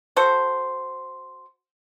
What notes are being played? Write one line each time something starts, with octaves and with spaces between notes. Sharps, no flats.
F#4 A4 C5